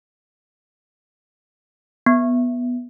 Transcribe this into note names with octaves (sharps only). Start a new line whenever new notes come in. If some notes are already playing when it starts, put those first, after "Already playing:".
B3